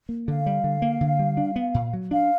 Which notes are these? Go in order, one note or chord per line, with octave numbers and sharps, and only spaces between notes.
A#3
D3 F5
G3
D3
A#3
D3
G3
D4
B3
A#2
F#3
D4 F5